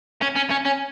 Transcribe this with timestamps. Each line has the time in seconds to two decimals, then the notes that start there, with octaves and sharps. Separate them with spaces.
0.21 C#4
0.36 C#4
0.50 C#4
0.65 C#4